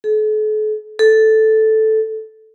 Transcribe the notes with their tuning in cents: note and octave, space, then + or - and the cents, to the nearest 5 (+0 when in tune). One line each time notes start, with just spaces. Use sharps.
A4 -45
A4 -5